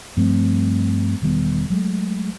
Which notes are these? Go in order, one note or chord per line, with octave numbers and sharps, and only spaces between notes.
G2 F3 A3 C4
E1 D#3 G3 B3
F#3 G#3 A3